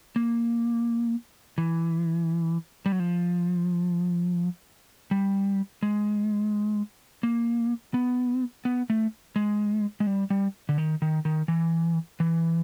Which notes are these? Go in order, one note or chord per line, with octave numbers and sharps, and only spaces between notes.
A#3
E3
G3
F#3
F3
G3
G#3
A#3
B3
B3
A3
G#3
G#3
G3
G3
D3
D#3
D#3
D#3
E3
E3